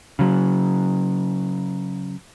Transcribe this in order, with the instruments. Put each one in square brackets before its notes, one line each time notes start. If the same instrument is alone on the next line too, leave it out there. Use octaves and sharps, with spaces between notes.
[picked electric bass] C#3 F#3